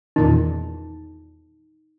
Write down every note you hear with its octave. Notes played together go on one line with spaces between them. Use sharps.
E2 A#2 D#3 D#4